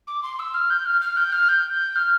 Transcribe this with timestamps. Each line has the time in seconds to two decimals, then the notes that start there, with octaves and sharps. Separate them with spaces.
0.07 D6
0.23 C6
0.39 E6
0.54 F6
0.70 G6
0.86 F6
1.01 F6
1.17 G6
1.32 F6
1.48 G6
1.95 F6